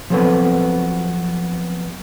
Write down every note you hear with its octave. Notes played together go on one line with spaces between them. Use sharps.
F3 F#3 B3 C4 A4 B4